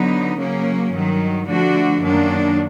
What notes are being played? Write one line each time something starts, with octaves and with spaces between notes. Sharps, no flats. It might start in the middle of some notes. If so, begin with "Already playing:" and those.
Already playing: D3 F#3 B3 D#4
C#3 F#3 A#3 C#4
G2 D#3 F#3
D3 F3 A3 D4 F#4
F#2 D#3 F#3 A#3 D4